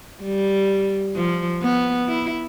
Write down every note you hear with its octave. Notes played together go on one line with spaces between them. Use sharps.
G3
F3
B3
E4